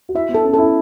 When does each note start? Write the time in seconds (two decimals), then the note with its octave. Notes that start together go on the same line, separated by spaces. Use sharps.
0.09 F#4
0.15 E4 E5
0.29 B3
0.34 A4
0.44 C#4
0.54 E4 A4